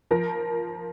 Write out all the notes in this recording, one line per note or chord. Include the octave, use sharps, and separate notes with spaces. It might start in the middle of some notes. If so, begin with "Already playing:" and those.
F3 A#4